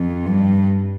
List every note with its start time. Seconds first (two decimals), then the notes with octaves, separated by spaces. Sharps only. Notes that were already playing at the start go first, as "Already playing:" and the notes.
Already playing: F2
0.26 G2